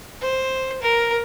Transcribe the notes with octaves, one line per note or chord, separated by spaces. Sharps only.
C5
A#4